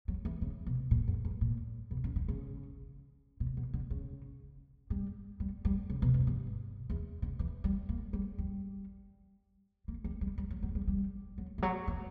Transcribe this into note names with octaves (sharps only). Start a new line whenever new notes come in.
F#3
E3
C#3
B2
A#2
F#2
G2
A#2
B2
C#3
D3
C#3
B2
B2
D3
C#3
G3
G3
G3
C#3
B2
F#2
G2
E2
D3
E3
G3
A#3
G3
G3
A#3
G3
G3
G3
F#3
F#3
G3
G3
F#3
E3
F#3
E3